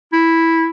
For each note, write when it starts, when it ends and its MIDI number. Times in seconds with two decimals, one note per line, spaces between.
0.13 0.68 64